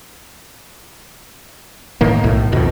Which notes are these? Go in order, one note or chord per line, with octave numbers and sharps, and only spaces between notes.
A2 D#3 A#3
B1 A2
F2 B2 D#3